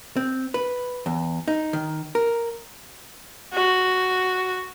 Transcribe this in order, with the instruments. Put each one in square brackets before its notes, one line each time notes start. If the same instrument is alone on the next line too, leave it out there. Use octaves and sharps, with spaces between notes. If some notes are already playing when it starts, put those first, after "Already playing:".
[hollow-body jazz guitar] C4
B4
E2
D#4
D#3
A#4
[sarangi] F#4